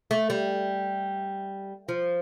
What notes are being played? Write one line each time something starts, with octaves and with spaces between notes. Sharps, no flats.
A3
G3
F3